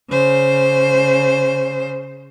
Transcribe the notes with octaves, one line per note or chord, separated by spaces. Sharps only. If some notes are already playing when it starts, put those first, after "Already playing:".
C#3 C5